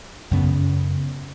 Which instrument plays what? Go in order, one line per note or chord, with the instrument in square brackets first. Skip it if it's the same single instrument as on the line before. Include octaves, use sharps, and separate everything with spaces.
[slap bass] F#2 C#3 B3